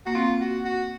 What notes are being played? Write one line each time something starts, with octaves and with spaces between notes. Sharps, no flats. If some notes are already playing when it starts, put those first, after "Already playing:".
A#3 F#4
C4 F4
F#4
F#4